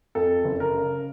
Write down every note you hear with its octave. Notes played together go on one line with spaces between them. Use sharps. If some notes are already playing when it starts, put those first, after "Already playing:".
F2 A4
F#1
A#4
C#3